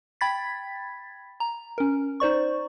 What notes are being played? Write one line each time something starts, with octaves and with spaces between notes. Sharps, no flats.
G5 B5 G#6 A6 B6
A#5
C#4 A#4
D#4 C5 D5 C#6